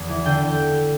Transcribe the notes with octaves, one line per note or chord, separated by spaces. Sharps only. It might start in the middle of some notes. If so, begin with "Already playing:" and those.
Already playing: E2
E3
D3 G5